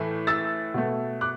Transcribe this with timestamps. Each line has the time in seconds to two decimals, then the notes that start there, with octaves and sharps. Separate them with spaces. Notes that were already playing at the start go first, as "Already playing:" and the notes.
Already playing: A2 E3 A3
0.27 E6 A6
0.74 B2 A3
1.21 D6 F#6